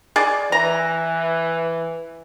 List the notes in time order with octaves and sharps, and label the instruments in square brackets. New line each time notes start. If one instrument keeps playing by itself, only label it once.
[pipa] G#4 D5
[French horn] E3 [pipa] A#5